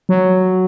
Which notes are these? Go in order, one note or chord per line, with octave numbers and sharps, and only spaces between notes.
F#3